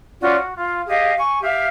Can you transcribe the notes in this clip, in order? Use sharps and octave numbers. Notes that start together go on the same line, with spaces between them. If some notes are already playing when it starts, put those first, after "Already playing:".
C#4 F4 F#4 D5
F#4
F4
G4 G#4 D#5 F5
G#5 C#6
G4 E5 F5